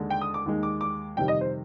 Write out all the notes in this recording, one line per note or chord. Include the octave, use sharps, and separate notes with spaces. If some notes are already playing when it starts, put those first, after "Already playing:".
Already playing: D#2 D3 G#3
G5
D#6
D6
D#2 D#3 G#3
D6
D6
F2 C3 D#3 G3 G5
D#5
C5